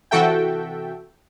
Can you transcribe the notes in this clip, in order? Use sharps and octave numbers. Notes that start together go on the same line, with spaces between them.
C3 E3 F#4 A4 E5 G5